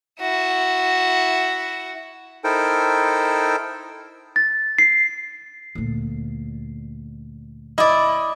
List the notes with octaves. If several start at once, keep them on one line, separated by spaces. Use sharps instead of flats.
E4 F#4
D#4 E4 A4 A#4 C5 G5
A6
C7
D2 A#2
E4 D5 D#5